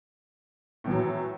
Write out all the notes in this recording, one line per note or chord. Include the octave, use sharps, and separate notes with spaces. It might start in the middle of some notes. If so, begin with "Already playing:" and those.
A2 E3 F#3